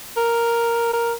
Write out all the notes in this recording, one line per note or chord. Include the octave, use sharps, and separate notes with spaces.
A#4
A#4